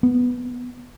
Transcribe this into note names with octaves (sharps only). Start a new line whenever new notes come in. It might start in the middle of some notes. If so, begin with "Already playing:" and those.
B3